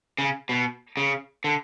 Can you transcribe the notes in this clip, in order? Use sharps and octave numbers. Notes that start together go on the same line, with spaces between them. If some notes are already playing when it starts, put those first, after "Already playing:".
C#3
B2
C#3
D3